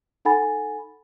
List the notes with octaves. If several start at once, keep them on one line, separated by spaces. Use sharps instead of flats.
D#4 A4 F#5 G#5 B5 A6